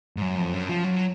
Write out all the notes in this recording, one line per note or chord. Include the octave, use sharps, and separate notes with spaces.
G#2
F#2
F2
F#2
F3
F#3